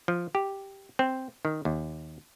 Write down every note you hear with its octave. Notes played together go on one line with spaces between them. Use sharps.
F3
G4
C4
D#3
D#2